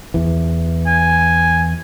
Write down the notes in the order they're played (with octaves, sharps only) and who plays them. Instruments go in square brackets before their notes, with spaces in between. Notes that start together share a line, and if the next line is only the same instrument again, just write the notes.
[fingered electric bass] E2 E3
[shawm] G#5